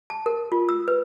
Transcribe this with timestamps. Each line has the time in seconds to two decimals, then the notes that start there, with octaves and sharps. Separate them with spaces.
0.10 A5
0.26 A#4
0.52 F4
0.69 E6
0.88 B4